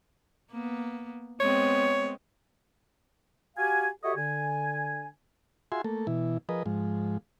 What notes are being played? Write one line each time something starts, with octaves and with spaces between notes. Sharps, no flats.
A#3 B3
G#3 B3 C4 C#5
F#4 G4 F5 G#5
F#4 G4 A4 C#5 D#5 E5
D3 G#5
F4 F#4 G#4 E5 G#5 C6
A3 A#3 A4
B2 E3 E4
F3 G#4 A#4 B4 D#5
G#2 F3 G#3